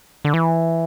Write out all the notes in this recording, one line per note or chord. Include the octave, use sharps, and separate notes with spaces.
D3
E3